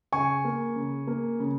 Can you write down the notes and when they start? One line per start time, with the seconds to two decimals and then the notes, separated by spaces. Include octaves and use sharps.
0.13 C#3 G#5 C#6
0.45 A#3
0.76 C#3
1.07 A#3
1.40 C#3